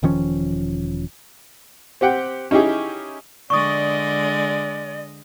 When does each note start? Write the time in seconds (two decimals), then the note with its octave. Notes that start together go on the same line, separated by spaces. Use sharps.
0.03 E1 D#3 F3 C#4
2.01 C4 G4 F#5 G5
2.51 C#4 D#4 E4 G4 G#4
3.50 D3 G#3 D5 D#5 C#6 D#6